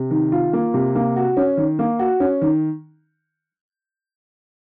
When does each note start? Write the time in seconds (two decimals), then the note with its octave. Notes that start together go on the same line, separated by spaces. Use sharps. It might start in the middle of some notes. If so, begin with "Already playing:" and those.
Already playing: C3
0.11 D#3
0.32 F4
0.53 A#3
0.74 C3
0.95 A#3
1.16 F#4
1.37 C#4
1.57 D#3
1.79 A#3
1.99 F#4
2.20 C#4
2.42 D#3